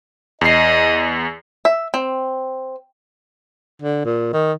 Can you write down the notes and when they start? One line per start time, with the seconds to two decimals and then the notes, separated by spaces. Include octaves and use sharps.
0.41 E2 D#5 C7
1.65 E5
1.94 C4
3.82 D3
4.05 A#2
4.33 D#3